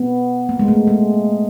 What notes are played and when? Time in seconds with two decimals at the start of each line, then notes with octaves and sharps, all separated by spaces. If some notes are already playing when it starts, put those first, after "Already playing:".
Already playing: B3
0.49 A#3
0.59 G#3
0.68 A3
0.87 G#3